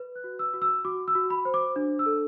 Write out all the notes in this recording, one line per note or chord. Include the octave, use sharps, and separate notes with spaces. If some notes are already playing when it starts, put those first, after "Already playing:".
Already playing: B4
F#6
F#4
E6
F#4
E6
F#4 D6
E6
F#4
B5
C5
D6
D4
E6
A4